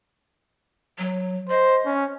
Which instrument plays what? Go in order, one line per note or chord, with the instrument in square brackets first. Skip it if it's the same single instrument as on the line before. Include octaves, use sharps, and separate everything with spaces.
[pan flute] F#3
[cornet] C5 [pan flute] D#5
[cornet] C#4